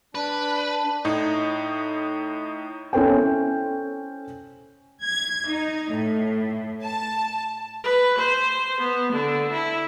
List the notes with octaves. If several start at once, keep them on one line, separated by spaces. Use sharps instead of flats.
D4 B4
A2 D#4
C#4 E4 A4 C5 C#5 G5
G#6
D#4
A2
A5
B4
C5
B3
D3
E4